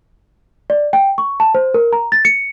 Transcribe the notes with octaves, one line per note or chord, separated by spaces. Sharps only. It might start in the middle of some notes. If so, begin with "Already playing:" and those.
D5
G5
C#6
A5
C5
A#4
A#5
A6
C#7